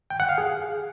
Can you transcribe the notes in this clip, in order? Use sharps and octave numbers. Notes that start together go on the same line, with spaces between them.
G5
F#5
F5
G#4